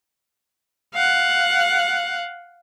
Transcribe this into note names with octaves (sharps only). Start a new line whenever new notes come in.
F5 F#5